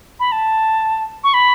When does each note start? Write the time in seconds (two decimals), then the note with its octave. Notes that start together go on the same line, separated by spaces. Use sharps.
0.20 B5
0.32 A5
1.24 C#6
1.34 B5